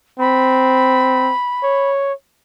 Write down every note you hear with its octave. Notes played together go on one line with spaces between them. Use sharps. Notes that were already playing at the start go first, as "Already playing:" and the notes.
C4 B5
C#5